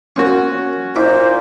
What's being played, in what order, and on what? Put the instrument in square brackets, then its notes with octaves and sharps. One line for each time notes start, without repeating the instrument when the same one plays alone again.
[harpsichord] A#3 C4 C#6 [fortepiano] C#4 F#4
[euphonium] A#2 [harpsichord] D#4 E4 D6 [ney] C5